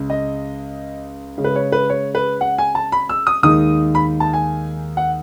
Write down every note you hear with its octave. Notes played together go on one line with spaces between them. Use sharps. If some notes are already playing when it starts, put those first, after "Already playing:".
Already playing: C#2 C#3 G#3
D#5
C#3 G#3 C#4
B4
C#5
B4
C#5
B4
F#5
G#5
A5
B5
E6
D#6
D#2 D#3 G#3 D#4 D#6
B5
A5
G#5
F#5